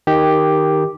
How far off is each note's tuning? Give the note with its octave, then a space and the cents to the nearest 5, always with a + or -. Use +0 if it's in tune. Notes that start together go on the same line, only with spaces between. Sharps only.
D#3 +0 G4 +0